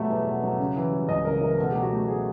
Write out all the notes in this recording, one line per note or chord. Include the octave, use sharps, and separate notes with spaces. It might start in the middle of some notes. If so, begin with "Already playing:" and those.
Already playing: B2 F#3 G3 A3 E5
E2
B2
F#3
C#3
E3
G3
C#2 D#5
C#3 A#4
E3 A#4
B2 A4
F#3 G4
F#4
A3 G4
G#4